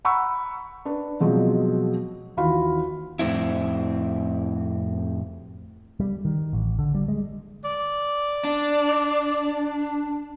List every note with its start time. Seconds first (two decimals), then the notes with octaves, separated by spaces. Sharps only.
0.05 F#5 A#5 B5 C#6 E6
0.85 D4 B4
1.20 B2 F3 F#3 G#3 C4
2.37 D#2 E3 F4 F#4 F5 B5
3.19 F2 A2 D#3 C4 E4
6.00 G3
6.25 D#3
6.53 A1
6.79 D3
6.95 G3
7.08 G#3
7.65 D5
8.44 D4